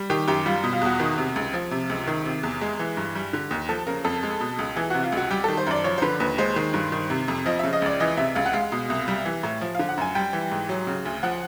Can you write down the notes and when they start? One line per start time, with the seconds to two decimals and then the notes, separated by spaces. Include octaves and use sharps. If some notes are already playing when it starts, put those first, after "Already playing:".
Already playing: G3
0.10 D#3 G4
0.28 F#2 G4
0.46 G3 F4
0.64 B2
0.73 F4
0.81 E2 F#4
1.00 D#3
1.18 C3
1.36 C#2
1.54 F3
1.71 C3
1.90 C#2
2.07 D#3
2.25 C3
2.43 E2
2.61 G#3
2.79 E3
2.97 G2
3.15 G3
3.33 D3
3.51 D#2
3.69 F3 A4
3.87 C#3 A#4
4.05 F2 A4
4.23 G#3
4.41 B2
4.59 C#2
4.76 E3 G#4
4.90 C3 F#4
5.03 F4
5.12 C#2 F#4
5.31 G3 G4
5.44 A4
5.48 D#3
5.57 C5
5.67 F#2 D5
5.84 F3 C#5
5.98 C5
6.02 D3 B4
6.20 D#2 B4
6.38 G#3 C5
6.56 D#3
6.74 G2
6.92 D#3
7.10 C3
7.28 F2
7.46 F3 D#5
7.59 E5
7.64 C#3
7.73 D#5
7.82 C#2 D5
8.00 E3 D#5
8.17 C3 E5
8.35 C#2 F5
8.46 F#5
8.53 G#3 F5
8.72 B2
8.90 C2
9.08 G3
9.25 E3
9.43 A2
9.61 F3
9.75 F5
9.79 D3
9.89 F#5
9.97 F#2 G#5
10.15 G3 G5
10.33 E3
10.51 G#2
10.69 F#3
10.87 C#3
11.05 D2
11.23 F3 F#5